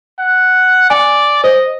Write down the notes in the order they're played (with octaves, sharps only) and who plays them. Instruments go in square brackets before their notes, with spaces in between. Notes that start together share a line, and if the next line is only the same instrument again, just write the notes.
[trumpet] F#5
[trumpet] D5 [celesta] G#5
[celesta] C5 [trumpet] D#5